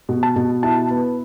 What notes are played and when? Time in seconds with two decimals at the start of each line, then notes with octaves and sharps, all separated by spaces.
0.09 B2
0.23 A5
0.36 B2
0.63 E4 A5
0.91 B3